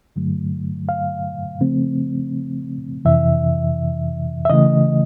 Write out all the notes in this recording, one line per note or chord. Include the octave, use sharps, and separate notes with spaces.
G2 D3 F#3 A3
F5
C#3 F3 A3 C4
F2 C3 E3 E5
E5
C#3 E3 A3 D#5